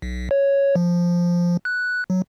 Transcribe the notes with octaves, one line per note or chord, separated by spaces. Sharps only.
B1
C#5
F3
F#6
F#3